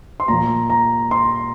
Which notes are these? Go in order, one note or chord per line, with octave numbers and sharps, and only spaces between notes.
C6
A#2 F3 A#5
A#5
C6